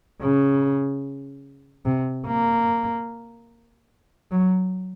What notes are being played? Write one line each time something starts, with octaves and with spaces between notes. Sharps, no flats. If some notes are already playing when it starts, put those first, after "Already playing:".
C#3
C3
A#3
F#3